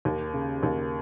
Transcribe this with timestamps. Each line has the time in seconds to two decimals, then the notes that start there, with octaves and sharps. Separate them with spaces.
0.05 D#2
0.34 C#3
0.63 D#2